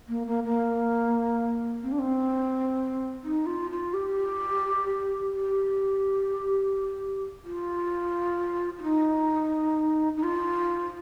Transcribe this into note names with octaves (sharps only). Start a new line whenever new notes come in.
A#3
A#3
A#3
C4
D4
C4
D#4
F4
F4
G4
G4
F4
F4
D#4
D#4
F4